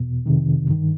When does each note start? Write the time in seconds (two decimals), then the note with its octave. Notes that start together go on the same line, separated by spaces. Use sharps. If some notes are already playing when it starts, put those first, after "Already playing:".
Already playing: E2 B2
0.26 F2 C3 D#3
0.69 G2 D#3